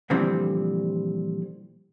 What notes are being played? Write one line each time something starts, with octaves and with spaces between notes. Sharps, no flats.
A#2 D3 E3 F3 G3 C4